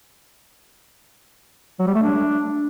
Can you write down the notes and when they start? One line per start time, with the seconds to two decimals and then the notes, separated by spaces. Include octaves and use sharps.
1.79 F#3
1.87 G3
1.95 A3
2.02 D4